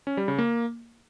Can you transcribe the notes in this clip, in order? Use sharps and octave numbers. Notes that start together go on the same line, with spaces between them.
C#4
G3
C#3
A#3